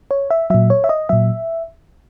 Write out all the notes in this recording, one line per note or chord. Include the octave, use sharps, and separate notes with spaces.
C#5
E5
A#2 F#3 E5
C#5
E5
D#5
A#2 F#3 E5